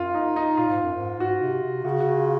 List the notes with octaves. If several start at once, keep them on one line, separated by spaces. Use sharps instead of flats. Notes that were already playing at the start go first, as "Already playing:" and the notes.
Already playing: F#2 F4
D#4
D#4
A#2 F4
G#2
F#2
G#2
G#2 F#4
C3
C3
C#3 F#4
F#4
F4